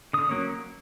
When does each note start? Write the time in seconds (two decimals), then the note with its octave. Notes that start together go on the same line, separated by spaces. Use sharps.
0.13 D3 D#6
0.29 F#3 A#3 C#4